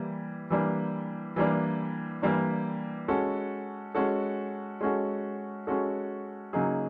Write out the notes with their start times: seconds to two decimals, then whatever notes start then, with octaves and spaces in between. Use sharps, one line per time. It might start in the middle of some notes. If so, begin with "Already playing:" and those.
Already playing: E3 G3 A#3
0.50 E3 G3 A#3 D4
1.36 E3 G3 A#3 D4
2.22 E3 G3 A#3 D4
3.08 G#3 C#4 F#4 A4
3.95 G#3 C#4 F#4 A4
4.81 G#3 C#4 F#4 A4
5.67 G#3 C#4 F#4 A4
6.53 C#3 F#3 A#3 D#4 G#4